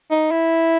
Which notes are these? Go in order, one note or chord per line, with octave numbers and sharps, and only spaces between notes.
D#4
E4